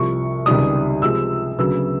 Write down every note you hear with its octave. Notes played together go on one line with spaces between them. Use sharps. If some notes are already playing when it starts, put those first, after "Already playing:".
Already playing: C2 C3 F3 C#6
C#2 C3 D#3 G3 D#6
C3 F3 G#3 E6
D2 C#3 F#3 B3 E6